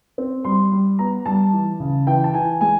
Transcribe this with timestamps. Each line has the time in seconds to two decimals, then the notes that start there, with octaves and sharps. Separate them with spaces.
0.18 C4
0.44 G3 C6
0.72 G3
0.99 B3 A#5
1.26 G3 A5
1.53 E3
1.80 C#3
2.07 E3 G5
2.24 A5
2.34 E3 G#5
2.61 G#3 G#5